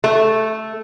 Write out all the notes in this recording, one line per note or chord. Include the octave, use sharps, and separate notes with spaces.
A3